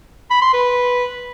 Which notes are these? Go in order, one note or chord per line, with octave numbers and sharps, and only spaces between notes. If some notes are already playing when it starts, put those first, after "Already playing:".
B5
C6
B4